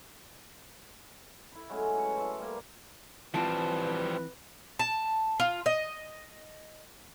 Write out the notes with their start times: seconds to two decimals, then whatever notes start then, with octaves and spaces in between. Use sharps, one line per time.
1.52 E4 B5
1.69 F#3 G#3 A3 C#4
1.97 B4 C#5 F#5
2.16 E5 F5 A5 C6
2.39 G3 A#3
3.34 E3 F3 G3 C4 F4 B4 A5
4.79 A5
5.40 F4
5.66 D#5